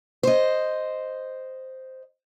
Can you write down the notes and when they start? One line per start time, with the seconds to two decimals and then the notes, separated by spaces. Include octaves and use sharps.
0.23 C5 D#5